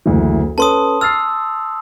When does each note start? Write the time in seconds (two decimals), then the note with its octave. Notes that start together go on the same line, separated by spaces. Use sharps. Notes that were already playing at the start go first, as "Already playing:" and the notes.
0.06 F#1 D2 E3
0.58 C#4 A4 B4 A5 C6 D#6
1.01 E6 F6 A6 C7